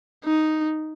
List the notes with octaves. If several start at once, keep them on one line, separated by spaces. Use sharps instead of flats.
D#4